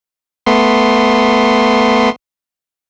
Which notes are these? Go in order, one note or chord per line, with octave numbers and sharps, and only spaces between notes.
A3 B3 C6